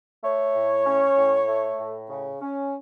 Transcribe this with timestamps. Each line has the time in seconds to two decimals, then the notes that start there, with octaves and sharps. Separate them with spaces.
0.23 A3 C#5
0.54 A2
0.86 C#4
1.17 A2
1.48 A3
1.79 A2
2.10 C#3
2.41 C#4